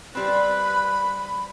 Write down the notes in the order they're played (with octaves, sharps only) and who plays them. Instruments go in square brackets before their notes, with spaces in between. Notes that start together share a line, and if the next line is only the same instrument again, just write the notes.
[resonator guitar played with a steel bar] G3 C4 [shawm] B4 [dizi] B5